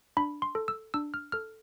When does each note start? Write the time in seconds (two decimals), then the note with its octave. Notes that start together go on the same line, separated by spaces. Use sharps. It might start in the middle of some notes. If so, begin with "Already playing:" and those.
0.17 D4 B5
0.42 C6
0.55 A4
0.68 E6
0.94 D4 E6
1.14 F6
1.32 A4 F6